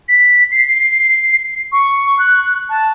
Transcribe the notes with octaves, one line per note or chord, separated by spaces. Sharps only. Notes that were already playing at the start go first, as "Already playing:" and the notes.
B6
C7
C#6
F#6
A5